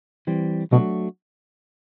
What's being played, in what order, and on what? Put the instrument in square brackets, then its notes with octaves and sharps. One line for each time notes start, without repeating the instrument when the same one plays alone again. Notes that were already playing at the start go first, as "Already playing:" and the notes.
[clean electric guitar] E3 G3 C4
[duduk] B2 [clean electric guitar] F#3 A3 D4 F#4